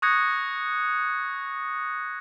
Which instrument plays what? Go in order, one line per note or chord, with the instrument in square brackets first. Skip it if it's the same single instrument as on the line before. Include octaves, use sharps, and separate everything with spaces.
[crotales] C#6 D#6 F#6 G#6 A#6 C#7